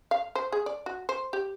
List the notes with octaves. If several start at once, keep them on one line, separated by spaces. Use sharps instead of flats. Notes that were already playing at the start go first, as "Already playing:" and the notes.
F5
C5
G#4
D5
F#4
C5
G4